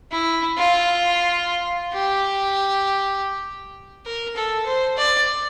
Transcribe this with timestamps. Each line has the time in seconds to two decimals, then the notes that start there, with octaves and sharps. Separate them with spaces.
0.12 E4
0.57 F4
1.93 G4
4.06 A#4
4.36 A4
4.66 C5
4.97 D5